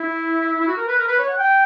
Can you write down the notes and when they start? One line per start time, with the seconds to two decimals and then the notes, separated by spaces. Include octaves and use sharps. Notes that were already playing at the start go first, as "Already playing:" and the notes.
Already playing: E4
0.59 E4
0.67 F#4
0.77 A#4
0.87 B4
0.98 A#4
1.07 B4
1.18 C#5
1.29 F#5
1.38 G5